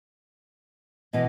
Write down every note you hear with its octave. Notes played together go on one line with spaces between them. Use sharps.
B2 E3 D#5